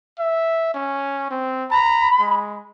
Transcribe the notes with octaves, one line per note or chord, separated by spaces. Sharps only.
E5
C#4
C4
A#5 B5
G#3